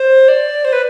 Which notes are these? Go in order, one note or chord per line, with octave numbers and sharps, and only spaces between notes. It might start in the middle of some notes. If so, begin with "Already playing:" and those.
Already playing: C5
D5
C5
B4